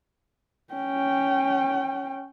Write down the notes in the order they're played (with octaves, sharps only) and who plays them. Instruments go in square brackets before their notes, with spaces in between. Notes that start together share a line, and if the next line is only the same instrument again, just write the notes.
[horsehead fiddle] C#4 G5